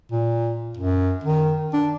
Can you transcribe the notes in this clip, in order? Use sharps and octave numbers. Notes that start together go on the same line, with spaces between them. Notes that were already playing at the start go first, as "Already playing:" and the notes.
A#2
F#2
D#3
D4